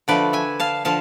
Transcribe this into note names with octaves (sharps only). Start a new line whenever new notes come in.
D3 F3 A3 B4 D5
E5 G#5
F5 A5
D3 F3 F5 A5